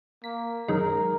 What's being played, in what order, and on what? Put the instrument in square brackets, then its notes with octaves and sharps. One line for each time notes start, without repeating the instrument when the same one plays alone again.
[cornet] A#3 [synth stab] B6
[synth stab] F#2 D#3 G#3 [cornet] A#4